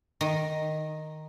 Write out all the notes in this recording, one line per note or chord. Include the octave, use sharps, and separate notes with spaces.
D#3 D#5